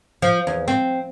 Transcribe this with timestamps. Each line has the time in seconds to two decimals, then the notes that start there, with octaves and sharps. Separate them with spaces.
0.22 F3
0.47 E2
0.68 C4